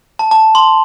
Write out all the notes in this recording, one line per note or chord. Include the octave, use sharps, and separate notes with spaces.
A5
A5
C6